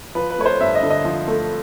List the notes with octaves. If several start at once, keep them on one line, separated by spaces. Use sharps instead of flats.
F3 B4
B4
A3 C#5
C5
G2 E5
D#5
D3
D#5
F3
A3